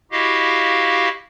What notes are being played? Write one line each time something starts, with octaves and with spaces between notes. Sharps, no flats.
E4 F#4 G4 D#5 F5